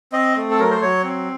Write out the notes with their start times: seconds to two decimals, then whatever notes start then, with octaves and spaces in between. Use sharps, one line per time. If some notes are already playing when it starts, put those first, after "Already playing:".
0.12 C4 D#5
0.36 A3
0.51 A4
0.58 F#3 A#4
0.71 C5
0.81 F#3 C#5
1.04 C4